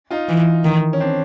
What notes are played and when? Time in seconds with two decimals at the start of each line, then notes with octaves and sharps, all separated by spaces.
0.11 D#4 F4
0.29 E3
0.64 D#3
0.93 C#4
1.00 C4 D4